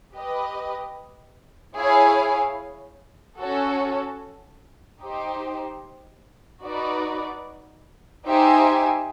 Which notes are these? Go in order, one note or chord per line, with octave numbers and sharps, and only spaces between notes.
G4 B4 D#5
E4 G#4 C#5 F5 G#5
C#4 F#4 A4
D#4 G4 C5
D#4 F#4 B4 D5
D#4 G4 C5 E5 G#5